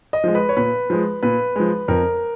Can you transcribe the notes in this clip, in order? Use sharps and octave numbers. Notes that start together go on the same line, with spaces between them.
D#5
F3 G#3
B4
C#5
A#2 B4
F3 G#3
A#2 B4
F3 G#3
F2 A#4